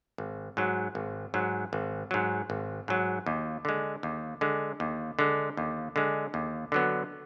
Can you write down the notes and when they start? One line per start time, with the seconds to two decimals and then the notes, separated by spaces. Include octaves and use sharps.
0.18 G#1
0.57 G#2 F#3
0.95 G#1
1.34 G#2 F#3
1.73 G#1
2.11 G#2 F#3
2.50 G#1
2.88 G#2 F#3
3.26 D#2
3.65 D3 G#3
4.03 D#2
4.41 D3 G#3
4.80 D#2
5.19 D3 G#3
5.57 D#2
5.96 D3 G#3
6.34 D#2
6.72 D3 F#3 B3